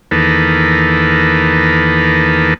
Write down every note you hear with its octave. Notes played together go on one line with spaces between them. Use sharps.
E2 D#3 A#3 A4 B4